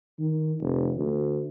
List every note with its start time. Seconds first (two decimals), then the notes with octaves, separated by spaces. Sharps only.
0.19 D#3
0.61 F1
0.97 D2